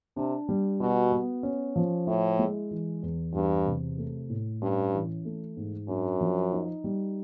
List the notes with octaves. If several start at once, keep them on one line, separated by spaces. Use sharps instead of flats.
C3 D4
G3
B2 F#4
B3
C#4
F3
A2 E4
G#3
E3
E2
E2 G2
C3
A3
A2
G2 C#4
E3
A3
G#2
F#2 D4
F3
D#4
G3